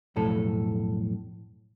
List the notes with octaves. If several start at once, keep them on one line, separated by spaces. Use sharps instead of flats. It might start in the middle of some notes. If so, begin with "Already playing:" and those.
B1 F2 A2 A4